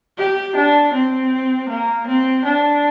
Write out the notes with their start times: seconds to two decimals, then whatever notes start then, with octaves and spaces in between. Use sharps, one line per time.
0.18 G4
0.56 D4
0.94 C4
1.69 A#3
2.07 C4
2.45 D4